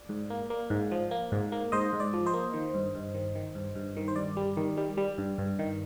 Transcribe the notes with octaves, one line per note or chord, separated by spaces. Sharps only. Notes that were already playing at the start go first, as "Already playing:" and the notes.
Already playing: D5
G#2
A#3
A#3
G#2
F3
A#3
G#2
A#3
G#2 C5 D#5
G#2
D5
F3
C5 D#5
A#3
D#3
G2
G2
D#3
D#3
G2
G2
D#3
C5
G2 D5
G3
D#3
G3
G3
G2
G2
D#3